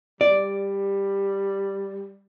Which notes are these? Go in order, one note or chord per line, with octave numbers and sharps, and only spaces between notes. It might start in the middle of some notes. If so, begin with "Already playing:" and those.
G3 D5